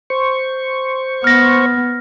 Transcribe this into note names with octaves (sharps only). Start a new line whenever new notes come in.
C5 C#6
B3 F6 A#6